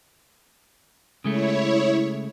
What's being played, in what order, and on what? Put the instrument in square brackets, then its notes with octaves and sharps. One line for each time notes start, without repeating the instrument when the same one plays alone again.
[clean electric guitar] C#3 G#3 A3 [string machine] E4 C#5